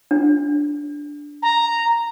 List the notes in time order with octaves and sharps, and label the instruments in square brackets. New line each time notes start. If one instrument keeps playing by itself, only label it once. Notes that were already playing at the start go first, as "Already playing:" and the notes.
[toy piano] D4
[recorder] A#5